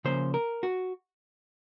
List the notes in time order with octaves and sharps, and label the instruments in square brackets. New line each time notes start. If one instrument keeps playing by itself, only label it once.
[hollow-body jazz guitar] C#3 F3 A#3 C#4 C5
A#4
F#4